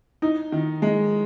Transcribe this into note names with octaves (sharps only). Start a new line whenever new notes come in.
D#4
D#3
G#3